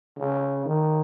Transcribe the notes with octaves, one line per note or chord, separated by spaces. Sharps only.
C#3
D#3